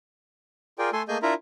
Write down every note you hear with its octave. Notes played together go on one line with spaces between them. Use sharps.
F4 G#4 A#4 D5 G5
A3 A4 G#5 C6
A3 A#3 G#4 D#5 G#5 G6
D4 E4 F4 A#4 E5 A#5